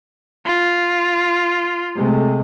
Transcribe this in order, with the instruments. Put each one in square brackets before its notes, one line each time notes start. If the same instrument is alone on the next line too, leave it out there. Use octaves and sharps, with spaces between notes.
[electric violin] F4
[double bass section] C3 G#3 A3